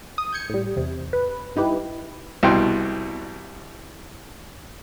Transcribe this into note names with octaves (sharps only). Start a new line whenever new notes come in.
D#6
G6 G#6 C#7
A2 G3
E2 C3
B4
G2 D#4 E4 G4 B4
C2 B2 G5 C6